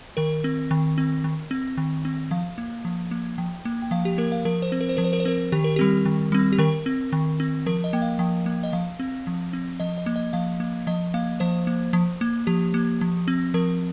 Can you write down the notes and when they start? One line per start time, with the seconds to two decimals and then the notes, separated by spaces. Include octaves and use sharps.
0.17 D#3 A#4
0.44 C4
0.71 D#3
0.98 C4
1.24 D#3
1.51 C4
1.77 D#3
2.05 C4
2.31 F3 F5
2.58 A#3
2.85 F3
3.11 A#3
3.38 F3 G5
3.65 A#3
3.82 G5
3.91 F3 F5
4.05 G4
4.18 A#3 A#4
4.32 F5
4.45 F3 A#4
4.62 C5
4.72 C4
4.81 A#4
4.89 C5
4.97 F3 A#4
5.04 C5
5.13 A#4
5.20 C5
5.25 C4 A#4
5.52 D#3 G4
5.64 A#4
5.76 G3 C4 G4
6.05 D#3
6.32 G3 C4
6.53 G4
6.58 D#3 A#4
6.86 C4
7.12 D#3
7.40 C4
7.66 F3 A#4
7.84 D#5
7.93 A#3 G5
8.02 F5
8.19 F3 G5
8.46 A#3
8.64 D#5
8.73 F3 F5
8.99 C4
9.27 F3
9.53 C4
9.80 F3 D#5
9.98 D#5
10.06 A#3
10.16 D#5
10.33 F3 F5
10.60 A#3
10.87 F3 D#5
11.14 A#3 F5
11.40 F3 C5
11.67 A#3
11.93 F3
12.21 A#3
12.47 F3 G4
12.74 A#3
13.01 F3
13.28 C4
13.54 F3 A#4